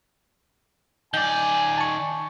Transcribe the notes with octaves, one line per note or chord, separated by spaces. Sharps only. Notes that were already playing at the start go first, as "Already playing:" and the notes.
D#3 D5 G#5 G6
A5 C#6